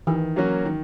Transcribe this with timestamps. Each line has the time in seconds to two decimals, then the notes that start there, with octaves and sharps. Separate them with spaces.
0.07 D#3 E3
0.36 F#3 A#3 C#4 F#4
0.65 D#3